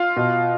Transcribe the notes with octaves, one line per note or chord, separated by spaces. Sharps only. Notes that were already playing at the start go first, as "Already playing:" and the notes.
Already playing: F4 F5
B2